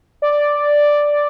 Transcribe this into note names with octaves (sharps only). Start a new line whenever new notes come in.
D5